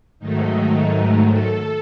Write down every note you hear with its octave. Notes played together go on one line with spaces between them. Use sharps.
G#2 D#3 F#3 A3 D#4
A4